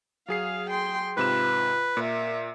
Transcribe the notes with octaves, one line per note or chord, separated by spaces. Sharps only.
F#3 G#4 F5 C7
G5 C6
G#2 C3 F4 B4 E7
A#2 A#4 E5